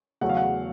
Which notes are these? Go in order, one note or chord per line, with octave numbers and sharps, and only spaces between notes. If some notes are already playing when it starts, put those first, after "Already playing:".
E2 C#3 F#3 A3 F#5
F5
F#5